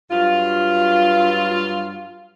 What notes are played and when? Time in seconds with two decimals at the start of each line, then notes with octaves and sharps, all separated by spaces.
0.11 G2 F#3 F4